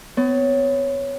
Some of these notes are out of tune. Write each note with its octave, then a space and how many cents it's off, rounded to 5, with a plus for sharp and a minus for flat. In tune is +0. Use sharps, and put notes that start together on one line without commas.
B3 +35 C#5 +0